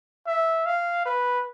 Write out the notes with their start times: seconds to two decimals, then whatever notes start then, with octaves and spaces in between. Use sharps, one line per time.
0.27 E5
0.66 F5
1.05 B4